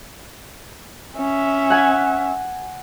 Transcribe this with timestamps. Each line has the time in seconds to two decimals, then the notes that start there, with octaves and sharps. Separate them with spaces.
1.17 C#4 E5
1.70 F#5 G#5 G#6